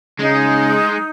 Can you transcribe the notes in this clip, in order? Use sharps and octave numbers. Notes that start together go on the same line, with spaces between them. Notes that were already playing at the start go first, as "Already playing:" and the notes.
C#3 G#3 D#4